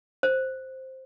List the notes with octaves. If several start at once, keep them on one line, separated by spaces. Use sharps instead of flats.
C5